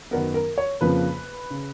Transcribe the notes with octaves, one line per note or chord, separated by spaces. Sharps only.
F#2 D#3 F#3 B3 A#4
A#4
C#5
F2 C#3 F3 A#3 B4
C#3